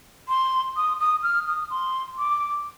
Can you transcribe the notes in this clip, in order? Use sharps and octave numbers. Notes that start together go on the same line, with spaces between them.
C6
D#6
D#6
F6
D#6
C6
D6